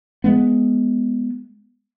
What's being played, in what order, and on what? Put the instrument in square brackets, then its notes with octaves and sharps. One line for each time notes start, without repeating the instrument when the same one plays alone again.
[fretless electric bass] G#3 A#3 B3